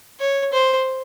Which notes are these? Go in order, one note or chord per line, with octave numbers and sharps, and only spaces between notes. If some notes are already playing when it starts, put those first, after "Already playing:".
C#5
C5